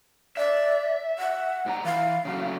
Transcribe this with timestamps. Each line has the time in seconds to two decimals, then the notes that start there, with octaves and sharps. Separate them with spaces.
0.37 D5 E5
1.19 F#5
1.66 G#2 G3 A#5
1.84 E3 F5
2.25 C#3 F#3 A3